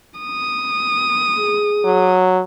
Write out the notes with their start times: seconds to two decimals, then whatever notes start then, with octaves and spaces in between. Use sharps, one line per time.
0.20 D#6
1.38 G#4
1.85 F#3